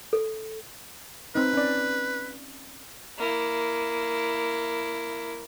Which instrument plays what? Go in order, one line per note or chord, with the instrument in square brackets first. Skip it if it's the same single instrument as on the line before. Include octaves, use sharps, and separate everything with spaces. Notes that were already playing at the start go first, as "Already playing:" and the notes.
[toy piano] A4
[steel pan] C4 D#4 [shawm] B4
[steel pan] C#4 D5
[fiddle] A#3 E4